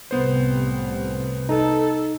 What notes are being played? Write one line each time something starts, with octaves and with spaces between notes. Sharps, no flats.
C2 A2 B3 C5
D#4 A4